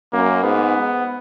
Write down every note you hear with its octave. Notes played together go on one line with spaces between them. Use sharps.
F#2 A#3
G#2 B3